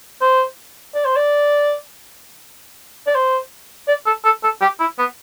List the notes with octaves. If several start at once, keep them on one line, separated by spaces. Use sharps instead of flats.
C5
D5
C5
D5
D5
C5
D5
A4
A4
A4
G4
E4
B3